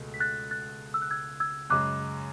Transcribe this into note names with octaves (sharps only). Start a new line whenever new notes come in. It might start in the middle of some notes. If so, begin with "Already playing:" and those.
Already playing: C#2 B2 A3
B6
F#6 A6
F#6 A6
E6
F#6
E6 G#6
E6 G#6
F#2 C#3 G#3 D6 F#6